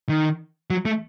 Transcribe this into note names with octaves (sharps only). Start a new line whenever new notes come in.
D#3
F#3
A3